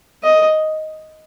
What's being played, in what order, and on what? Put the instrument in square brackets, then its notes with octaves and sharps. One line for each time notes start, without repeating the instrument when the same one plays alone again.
[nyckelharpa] D#5